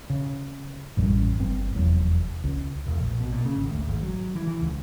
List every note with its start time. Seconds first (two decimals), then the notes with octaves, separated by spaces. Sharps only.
0.10 C#3
0.97 A1 F#2 G3
1.39 G1 G2 C4
1.75 F1 E2 F#3
2.44 C#2
2.87 E1
3.00 A#1
3.20 B2
3.32 A#2
3.45 C#3
3.56 G#1
3.71 D2
3.88 G#1
4.03 F#3
4.35 E3
4.48 E3
4.62 C#2